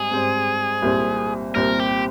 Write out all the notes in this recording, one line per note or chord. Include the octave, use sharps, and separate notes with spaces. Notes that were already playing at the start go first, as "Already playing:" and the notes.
Already playing: G#2 G3 C4 G#4
G#2 G3 C4
C2 A#2 G3 C4
C2 A#2 G3 C4 A#4
G4